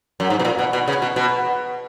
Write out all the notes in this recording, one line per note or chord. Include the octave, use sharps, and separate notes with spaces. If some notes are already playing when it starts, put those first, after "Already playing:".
F#2
G#2
B2
A#2
B2
B2
C#3
B2
B2